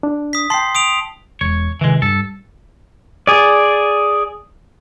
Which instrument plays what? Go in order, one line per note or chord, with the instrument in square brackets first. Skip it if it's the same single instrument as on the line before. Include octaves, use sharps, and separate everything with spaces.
[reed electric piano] D4
[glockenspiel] D#6 B6
[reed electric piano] G5 A5 [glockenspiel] C6 C7
[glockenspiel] D#6 D7 F7
[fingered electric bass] E1 [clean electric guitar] C#5
[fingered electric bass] C3 D#3 [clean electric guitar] E3 G#3
[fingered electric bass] G2 [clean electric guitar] A4
[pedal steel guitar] G#4 D5